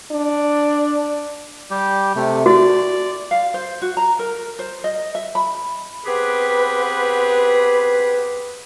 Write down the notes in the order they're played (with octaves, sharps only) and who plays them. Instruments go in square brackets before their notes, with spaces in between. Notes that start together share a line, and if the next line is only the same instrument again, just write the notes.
[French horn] D4
[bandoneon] G3 G4
C3 A3
[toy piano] F#4 [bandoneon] D5
[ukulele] F5
C5
F#4
A#5
A#4
C5
D#5
E5
B5
[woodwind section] B3 C4 G4 G#4 B4